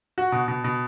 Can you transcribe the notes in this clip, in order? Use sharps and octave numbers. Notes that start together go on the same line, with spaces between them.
F#4
B2
B2
B2